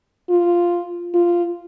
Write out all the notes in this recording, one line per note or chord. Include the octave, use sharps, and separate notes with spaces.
F4
F4